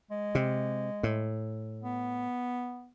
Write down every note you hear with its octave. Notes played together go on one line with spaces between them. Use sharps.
G#3
C3
A2
B3